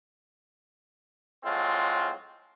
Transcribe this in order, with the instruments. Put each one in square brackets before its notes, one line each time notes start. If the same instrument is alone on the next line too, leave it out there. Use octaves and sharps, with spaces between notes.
[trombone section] A2 F#3 G#3 C4 F4